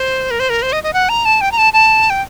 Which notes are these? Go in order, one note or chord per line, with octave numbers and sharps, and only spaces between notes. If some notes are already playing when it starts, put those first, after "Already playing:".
Already playing: C5
A#4
C5
A#4
C5
D#5
D#5
F#5
A#5
A5
G5
A#5
A5
A5
G5